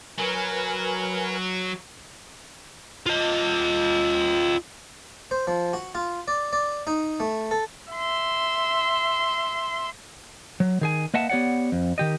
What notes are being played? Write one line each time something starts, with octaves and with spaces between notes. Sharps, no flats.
F#3 A#4 B4 G#5
F4 D#5
C5
F3
F#4
F4
D5
D5
D#4
A3
A4
E5 C6
F#3
D#3 G#4 G#5
A#3 B4 D#5 E5 F#5 A5
B3 G4 C#5 D5 F#5
F2
D#3 G4 D#5